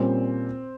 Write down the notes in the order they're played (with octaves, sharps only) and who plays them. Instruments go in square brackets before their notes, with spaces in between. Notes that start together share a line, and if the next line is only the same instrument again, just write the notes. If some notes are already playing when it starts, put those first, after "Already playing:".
Already playing: [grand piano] A#2 G3 C#4 [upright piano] C4